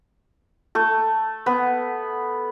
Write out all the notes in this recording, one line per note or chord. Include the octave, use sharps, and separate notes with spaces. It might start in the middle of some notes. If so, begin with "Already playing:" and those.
A3 A4
B3 B4